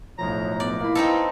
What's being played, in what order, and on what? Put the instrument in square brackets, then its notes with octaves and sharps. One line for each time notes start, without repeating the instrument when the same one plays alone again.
[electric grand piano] B1 A2 F3 [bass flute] C#5 [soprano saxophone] A#5
[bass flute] B3 [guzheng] D5
[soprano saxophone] A#3 [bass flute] E4 [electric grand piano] F5 B5
[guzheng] C4 D#4 A4 [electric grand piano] B4 [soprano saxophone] F5